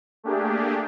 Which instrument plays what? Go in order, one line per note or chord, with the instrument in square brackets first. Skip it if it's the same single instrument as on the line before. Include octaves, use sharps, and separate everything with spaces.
[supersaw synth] A3 A#3 D4 G4 G#4